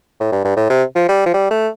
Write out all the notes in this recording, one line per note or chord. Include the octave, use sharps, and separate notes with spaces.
A2
G2
G2
A2
C3
F3
G3
F3
G3
A3